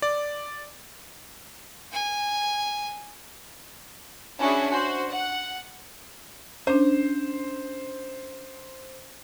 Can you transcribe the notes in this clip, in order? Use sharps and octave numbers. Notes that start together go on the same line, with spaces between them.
D5
G#5
C#4 D4 E4 F#4 G#4
F#4 C5
F#5
C#4 D4 C5